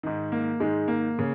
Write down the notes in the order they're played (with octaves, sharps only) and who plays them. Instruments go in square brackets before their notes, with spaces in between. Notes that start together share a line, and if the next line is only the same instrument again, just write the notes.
[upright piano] G#2 D#3
A#3
G#2 D#3 G#3
A#3
C#3